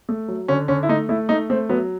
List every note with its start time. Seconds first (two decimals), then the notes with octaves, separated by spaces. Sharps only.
0.09 A3
0.28 F#3
0.48 D3 C#4
0.68 D3 C#4
0.83 E4
0.89 A3 D#4
1.09 A3 E4
1.29 A3 D#4
1.50 A3 C4
1.69 F#3 B3